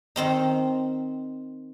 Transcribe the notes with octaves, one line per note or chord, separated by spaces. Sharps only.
D#3 C4 D#4